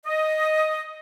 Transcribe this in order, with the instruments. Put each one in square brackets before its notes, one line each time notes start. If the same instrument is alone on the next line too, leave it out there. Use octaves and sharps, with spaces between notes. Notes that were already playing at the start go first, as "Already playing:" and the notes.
[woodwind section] D#5